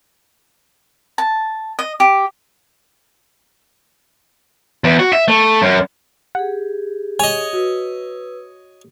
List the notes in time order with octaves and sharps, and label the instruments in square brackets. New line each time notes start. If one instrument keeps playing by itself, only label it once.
[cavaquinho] A5
D#5
G4
[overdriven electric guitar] E2
F#4
E5
A3
F#2
[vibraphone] G4 G#4 [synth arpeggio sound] F#5
[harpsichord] C#5 D#5 [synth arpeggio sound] G#5
[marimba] F#4 [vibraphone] B4 E6